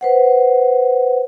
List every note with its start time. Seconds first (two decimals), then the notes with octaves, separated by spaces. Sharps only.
0.01 B4 C5 F#5